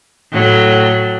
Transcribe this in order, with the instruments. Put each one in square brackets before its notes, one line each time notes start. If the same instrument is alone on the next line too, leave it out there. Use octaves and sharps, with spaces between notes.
[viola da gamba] A2 F#3